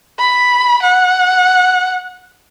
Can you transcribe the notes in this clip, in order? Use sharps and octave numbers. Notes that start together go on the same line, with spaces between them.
B5
F#5